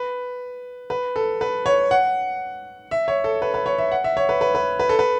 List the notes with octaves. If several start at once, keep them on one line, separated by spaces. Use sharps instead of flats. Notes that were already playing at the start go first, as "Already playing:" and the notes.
Already playing: B4
B4
A4
B4
C#5
F#5
E5
C#5
A4
B4
B4
C#5
E5
F#5
E5
C#5
B4
B4
B4
B4
A4
B4